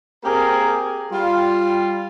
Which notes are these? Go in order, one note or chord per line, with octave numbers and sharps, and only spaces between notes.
A#3 C4 G4 G#4 A#4
G3 F4